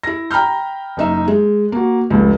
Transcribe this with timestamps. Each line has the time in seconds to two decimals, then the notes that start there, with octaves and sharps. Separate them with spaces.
0.03 E4 A#6
0.31 G5 A#5 B5 F6 G6
0.97 F#1 D#4 E5
1.28 G#3
1.72 A#3 F#4
2.10 F1 C#2